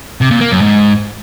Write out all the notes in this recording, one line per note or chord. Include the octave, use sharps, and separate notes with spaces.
C3
A#2
A#3
F#2
G#2